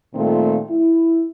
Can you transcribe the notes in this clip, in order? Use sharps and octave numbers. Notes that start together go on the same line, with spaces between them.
A#2 D#3 G3 A3 C4 F4
E4